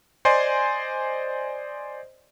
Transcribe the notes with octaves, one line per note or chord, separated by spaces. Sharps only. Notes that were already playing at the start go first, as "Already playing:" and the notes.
C5 D5 D#5 G#5 C6